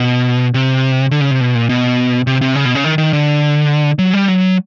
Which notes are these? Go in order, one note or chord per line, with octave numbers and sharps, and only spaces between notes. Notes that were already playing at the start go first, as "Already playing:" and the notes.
Already playing: B2
C3
D3
C#3
C3
B2
A#2
B2
C3
C3
C#3
B2
C#3
D#3
D#3
D3
F#3
G3
F#3